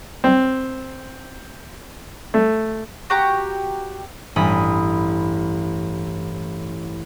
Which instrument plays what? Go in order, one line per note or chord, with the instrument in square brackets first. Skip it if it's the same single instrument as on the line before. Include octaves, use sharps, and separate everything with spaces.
[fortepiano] C4
A3
[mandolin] F#4 G4 A#5
[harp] A1 G2 B5 D#6